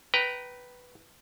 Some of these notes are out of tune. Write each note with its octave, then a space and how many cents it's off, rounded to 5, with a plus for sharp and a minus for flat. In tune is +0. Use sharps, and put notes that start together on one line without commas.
B4 +0 G5 -20 A#5 +0